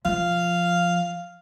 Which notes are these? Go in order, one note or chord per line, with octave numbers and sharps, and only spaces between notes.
F3 F5